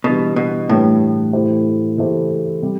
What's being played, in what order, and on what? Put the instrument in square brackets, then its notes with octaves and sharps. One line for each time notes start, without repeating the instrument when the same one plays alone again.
[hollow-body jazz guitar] B2 [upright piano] E3 G3 D4 G4 B4
[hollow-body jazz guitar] B2
[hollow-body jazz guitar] A2 [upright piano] E3 G3 D4 G4 B4
[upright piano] E3 A3 E4 G4 C5
E3 A3 E4 G4 C5
C3 G3